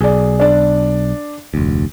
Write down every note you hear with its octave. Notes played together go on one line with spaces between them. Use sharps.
B1 G#4 D5
D4 D5
F1 D2